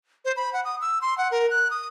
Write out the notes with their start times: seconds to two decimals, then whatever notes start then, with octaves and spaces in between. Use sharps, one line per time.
0.25 C5
0.36 B5
0.53 F#5
0.65 D#6
0.82 E6
1.02 C6
1.18 F#5
1.31 A#4
1.50 F#6
1.71 D#6